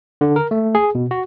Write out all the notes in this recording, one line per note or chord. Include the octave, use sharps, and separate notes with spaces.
D3
A#4
A3
G#4
B2
F#4